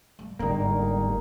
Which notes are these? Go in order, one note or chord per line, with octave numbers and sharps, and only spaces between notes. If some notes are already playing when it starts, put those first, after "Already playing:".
G3
G1 G#2 D3 G3 A#3 D#4 F4 A#4